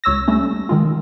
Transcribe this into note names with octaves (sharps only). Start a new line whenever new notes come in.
C#2 C#5 E6 A#6
G3 A3 C#4
D#3 G#3 F4